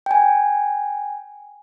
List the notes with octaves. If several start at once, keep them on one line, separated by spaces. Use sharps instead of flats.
G5 G#5